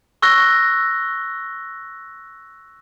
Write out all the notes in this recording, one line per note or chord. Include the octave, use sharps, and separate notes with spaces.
C#6 E6 F#6 A#6 G7